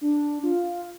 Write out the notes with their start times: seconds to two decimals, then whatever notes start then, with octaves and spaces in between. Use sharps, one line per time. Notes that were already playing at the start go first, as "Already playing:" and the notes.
0.01 D4
0.43 F4